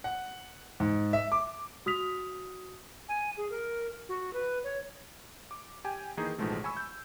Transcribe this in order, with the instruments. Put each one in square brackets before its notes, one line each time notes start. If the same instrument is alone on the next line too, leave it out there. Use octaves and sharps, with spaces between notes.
[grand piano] F#5
G#2
E5
D6
[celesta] F#4 D#6 F6 B6 F7
[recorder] G#5
G#4
A#4
F#4
B4
C#5
[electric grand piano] D6
G4 G5 G#5
D#3 E3 A#3 D#4 G#4
A1 B2 D#3 F3 G#3 A3
G#5 B5 C#6 E6
G6